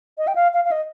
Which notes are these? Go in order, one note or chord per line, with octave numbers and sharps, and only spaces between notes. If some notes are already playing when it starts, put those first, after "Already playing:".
D#5
G5
F5
F5
F5
D#5